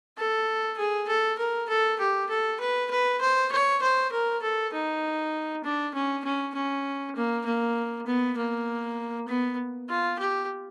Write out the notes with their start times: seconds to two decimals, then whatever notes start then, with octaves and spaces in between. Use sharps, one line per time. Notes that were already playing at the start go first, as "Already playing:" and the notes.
0.17 A4
0.78 G#4
1.08 A4
1.38 A#4
1.69 A4
1.99 G4
2.29 A4
2.60 B4
2.90 B4
3.21 C5
3.51 C#5
3.82 C5
4.12 A#4
4.42 A4
4.73 D#4
5.63 D4
5.94 C#4
6.24 C#4
6.54 C#4
7.16 A#3
7.45 A#3
8.06 B3
8.37 A#3
9.28 B3
9.89 F4
10.19 G4